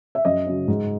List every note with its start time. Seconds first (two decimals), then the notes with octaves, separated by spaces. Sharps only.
0.15 E5
0.25 F#2 D#5
0.46 C#3 F#3
0.68 G#2